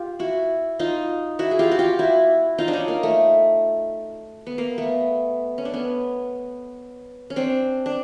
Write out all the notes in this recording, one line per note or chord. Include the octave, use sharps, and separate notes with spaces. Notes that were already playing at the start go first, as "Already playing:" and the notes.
Already playing: F4 G4
E4 F#4
D#4 F4
E4 F#4
G#4
F4 G4
F#4
F4 G4
E4 F#4
D#4 F4
D4
C#4 D#4
A#3
A3
B3
A#3
A3 B3
C#4
D4
B3 C#4
C#4
C4 D4
D4